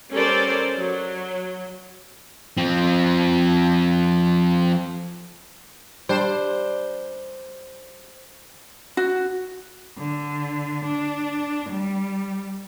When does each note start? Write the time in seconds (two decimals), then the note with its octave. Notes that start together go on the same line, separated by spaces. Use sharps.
0.12 G3 C#4 A4 A#4 C5 D5
0.78 F#3
2.57 F3 C4
6.09 G3 D4 C5
8.97 F#4
9.98 D3
10.85 D4
11.69 G3